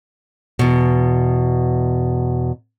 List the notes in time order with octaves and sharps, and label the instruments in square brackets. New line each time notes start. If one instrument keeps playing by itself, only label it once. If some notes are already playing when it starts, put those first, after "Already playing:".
[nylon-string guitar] E2 B2